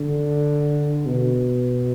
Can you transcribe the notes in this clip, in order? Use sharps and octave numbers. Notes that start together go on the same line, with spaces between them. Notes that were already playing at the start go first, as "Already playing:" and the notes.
Already playing: D3
B2